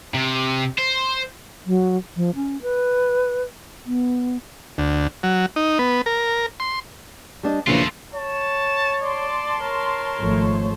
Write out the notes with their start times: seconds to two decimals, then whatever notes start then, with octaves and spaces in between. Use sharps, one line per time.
0.14 C3
0.79 C5
1.66 F#3
2.16 F3
2.35 C#4
2.62 B4
3.86 B3
4.78 D2
5.23 F#3
5.56 D#4
5.79 B3
6.06 A#4
6.60 C6
7.43 G3 D4 D#5
7.67 A#1 C#3 E3 A3 F4
8.14 C#5 A5
9.03 D5 A5 C6
9.61 A#4 C#5
10.19 G#1 F3 A3